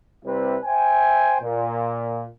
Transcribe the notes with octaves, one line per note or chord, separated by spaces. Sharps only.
C3 G3 C4 E4 B4
C5 E5 G5 G#5
A#2